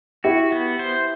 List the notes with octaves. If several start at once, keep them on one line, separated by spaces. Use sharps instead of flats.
E4 F#4 G4
B3
C5